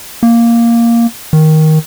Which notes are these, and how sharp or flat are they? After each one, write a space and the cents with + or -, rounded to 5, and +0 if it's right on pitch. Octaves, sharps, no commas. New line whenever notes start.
A#3 +0
D#3 +10